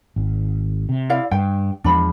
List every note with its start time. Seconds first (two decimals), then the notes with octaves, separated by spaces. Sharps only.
0.16 G#1
0.89 C3
1.10 E4 D5 F5
1.31 G2 G5
1.84 E2 F3 G#3 D4 B5